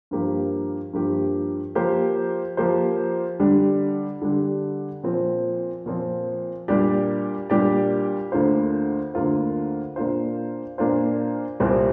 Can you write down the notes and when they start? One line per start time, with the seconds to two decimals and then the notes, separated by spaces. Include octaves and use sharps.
0.11 G2 F3 A#3 G4
0.93 G2 F3 A#3 G4
1.75 F3 A#3 G4 C5
2.57 F3 A#3 G4 C5
3.39 D3 G3 D4 G4
4.22 D3 G3 D4 G4
5.04 A#2 F3 C4
5.86 A#2 F3 C4
6.68 A#2 G3 D4 G4 D5
7.50 A#2 G3 D4 G4 D5
8.32 D2 D3 A#3 F4 C5
9.14 D2 D3 A#3 F4 C5
9.96 A#2 A#3 D4 F4 C5
10.78 A#2 A#3 D4 F4 C5
11.60 C2 A#2 G3 C4